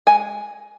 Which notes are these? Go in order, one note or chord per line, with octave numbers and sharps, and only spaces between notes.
G#3 G#5